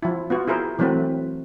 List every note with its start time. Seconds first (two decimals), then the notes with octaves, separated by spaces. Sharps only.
0.03 F3 E4
0.30 B3 F4 F#4
0.48 E4 G#4 A#4 C5
0.79 E3 F#3 A3 C4 B4